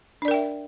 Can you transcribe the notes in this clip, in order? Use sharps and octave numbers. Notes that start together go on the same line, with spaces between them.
D4 A#4 D5 E5 G5